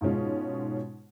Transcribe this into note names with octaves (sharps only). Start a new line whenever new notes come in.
G#2 B2 G#3 C#4 F4